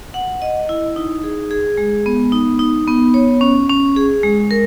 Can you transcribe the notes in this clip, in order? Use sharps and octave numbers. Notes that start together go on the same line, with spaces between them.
F#5
D#5
E4
D#4
G#4
G#4
G#3
B3
D#4
D#4
B3
C#5
C#4
C#4
G#4
G#3
A#4